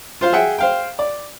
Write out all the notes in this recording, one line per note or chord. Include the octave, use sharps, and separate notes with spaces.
F4 C5 F5
G#4 E5 F#5 G5
C5 F5 G5
D5